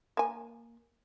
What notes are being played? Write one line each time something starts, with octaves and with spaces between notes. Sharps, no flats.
A#3 G#5